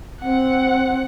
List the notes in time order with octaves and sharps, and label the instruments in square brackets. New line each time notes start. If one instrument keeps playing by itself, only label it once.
[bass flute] C4 [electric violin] F#5